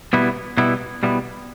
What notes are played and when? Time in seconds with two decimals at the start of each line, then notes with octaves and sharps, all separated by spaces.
0.13 B2 G3 B3 E4
0.57 B2 G3 B3 E4
1.03 B2 G3 B3 E4